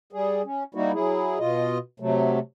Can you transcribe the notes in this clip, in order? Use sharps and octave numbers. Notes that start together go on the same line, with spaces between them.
G3 G#4
C#4
G3 A#3 D#4 E4 F#4
F#3 E4 G#4
B2 F4 D#5
C3 F#3 A3